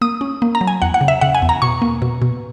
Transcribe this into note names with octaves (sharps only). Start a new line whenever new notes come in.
A#3 D#6
C#4
A#3
A#5
F#3
G#5
E2 F#5
F#5
C#3
E5
C#3 F#5
G#5
E2
A#5
B2 C#6
A#3
B2
B2